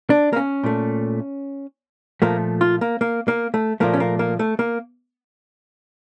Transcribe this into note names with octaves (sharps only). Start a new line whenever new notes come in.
D4
A#3
C#4
A#2 A3
A#2 F3 A3 A#3
F4
A#3
A#3
A#3
A3
A#2 F3 A3 A#3
C#4
A#3
A#3
A3
A#3